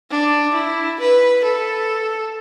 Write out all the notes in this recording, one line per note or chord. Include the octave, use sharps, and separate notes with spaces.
D4
E4
B4
A4